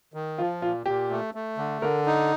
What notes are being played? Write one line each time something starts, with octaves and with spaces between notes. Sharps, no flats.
D#3
F3 F4
A#2 F4
A#2 G4
A3
A3
D3
D3 A#4
D#4